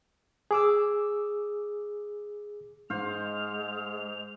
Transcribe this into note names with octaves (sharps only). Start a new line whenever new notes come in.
G#4 D6 E6
G#2 G#3 C5 F5 F7